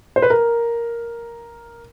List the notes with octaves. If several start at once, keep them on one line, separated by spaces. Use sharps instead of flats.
C5
B4
A#4